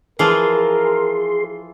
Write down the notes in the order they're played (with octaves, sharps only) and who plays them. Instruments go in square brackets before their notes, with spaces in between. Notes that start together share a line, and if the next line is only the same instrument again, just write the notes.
[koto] E3 F3 F4 [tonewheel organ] G#4 C6 [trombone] A#4